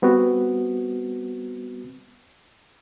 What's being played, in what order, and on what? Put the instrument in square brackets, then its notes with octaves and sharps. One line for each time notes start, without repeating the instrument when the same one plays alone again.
[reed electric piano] G3 B3 C4 F#4